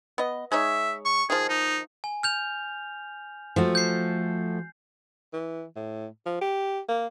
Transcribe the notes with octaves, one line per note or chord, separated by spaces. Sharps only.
B3 D#5
G#3 D#4 C#5 E5
C#6
D#3 F3 G#4
D#4
G#5
F6 G6 F7
F3 A3 F#4
G6 C7
E3
A2
F3
G4
A#3